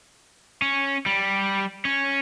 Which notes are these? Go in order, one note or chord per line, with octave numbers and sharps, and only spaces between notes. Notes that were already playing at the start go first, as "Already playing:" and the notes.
C#4
G3
C#4